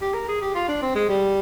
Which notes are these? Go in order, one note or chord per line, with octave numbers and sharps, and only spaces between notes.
G4
A#4
G#4
G4
F4
D4
C4
G#3
G3